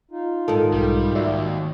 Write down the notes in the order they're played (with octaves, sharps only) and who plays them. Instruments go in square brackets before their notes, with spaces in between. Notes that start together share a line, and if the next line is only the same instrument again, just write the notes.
[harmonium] D#4 F4
[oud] G#2 D#3 [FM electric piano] A4
[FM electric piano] B1 [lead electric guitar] G3
[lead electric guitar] D#2 [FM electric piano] F#4 D5 E5